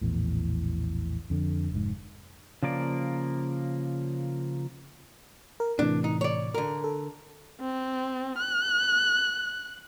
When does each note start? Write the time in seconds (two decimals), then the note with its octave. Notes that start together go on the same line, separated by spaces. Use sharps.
0.01 A#1 E2 A2
1.30 F2 D3
1.72 F1 G#2
2.63 C#3 F3 A#3 D5
5.60 A#4
5.79 A2 C3 E3 D4
6.04 D#4
6.21 C#5 D5
6.54 D3 A#4
6.84 A4
7.61 C4
8.38 F#6